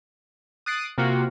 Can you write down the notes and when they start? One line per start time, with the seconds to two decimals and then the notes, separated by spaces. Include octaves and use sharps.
0.66 D#6 F#6 A6 C7 D7 D#7
0.98 C3 A#3 F4 F#4